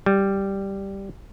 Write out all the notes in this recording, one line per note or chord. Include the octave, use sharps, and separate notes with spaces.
G3